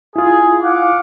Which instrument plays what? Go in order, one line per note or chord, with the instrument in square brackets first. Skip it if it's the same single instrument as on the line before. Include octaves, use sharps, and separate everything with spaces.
[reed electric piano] E4 F4 [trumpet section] G#4
[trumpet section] F5 F#5 D6